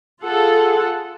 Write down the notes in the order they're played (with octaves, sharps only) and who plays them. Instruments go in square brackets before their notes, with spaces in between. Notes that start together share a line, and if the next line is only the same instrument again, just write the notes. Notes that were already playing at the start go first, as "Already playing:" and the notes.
[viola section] F4 G#4 A4 F#5